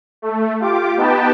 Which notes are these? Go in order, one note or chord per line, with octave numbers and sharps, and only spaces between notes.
A3
F4 G4 D6
B3 D#4 G4 B4 G5 A5